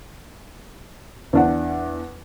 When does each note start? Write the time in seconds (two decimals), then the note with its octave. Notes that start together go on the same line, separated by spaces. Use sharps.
1.33 E2 D4 F#5